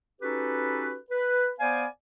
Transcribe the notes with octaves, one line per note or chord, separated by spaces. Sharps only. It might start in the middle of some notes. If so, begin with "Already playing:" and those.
C#4 D#4 F#4 G4 A4 B4
B4
B3 C5 D5 F5 G#5